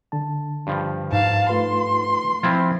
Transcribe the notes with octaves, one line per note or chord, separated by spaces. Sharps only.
D3 A5
G2 F3
G#2 F5 A5
A3 F4 B4 C6
F3 C4 E4 F4